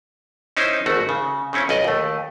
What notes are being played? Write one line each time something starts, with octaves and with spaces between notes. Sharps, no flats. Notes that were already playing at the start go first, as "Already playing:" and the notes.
C#4 D#4 E4 C5
G#1 A3 F#4
C#3
C#3 C4 C#4 E4
B1 D5 D#5
D#2 A3